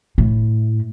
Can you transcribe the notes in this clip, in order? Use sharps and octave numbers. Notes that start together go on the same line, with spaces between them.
A2